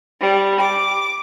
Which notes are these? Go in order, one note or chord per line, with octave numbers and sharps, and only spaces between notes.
G3
D6